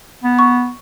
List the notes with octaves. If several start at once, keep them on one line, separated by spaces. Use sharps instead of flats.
B3
C#6